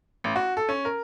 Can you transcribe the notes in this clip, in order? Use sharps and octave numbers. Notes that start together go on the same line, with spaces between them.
A1
F#4
A4
C#4
A#4